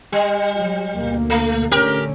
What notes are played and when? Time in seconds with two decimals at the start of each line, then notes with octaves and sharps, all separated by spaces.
0.12 G3
0.55 F#3
0.97 D2 B2 A#3
1.30 A3
1.72 D3 A3 C#4 G4 A#4